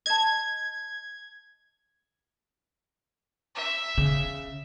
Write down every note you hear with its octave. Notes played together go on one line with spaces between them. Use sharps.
D#5 A5 G#6
E5
C#3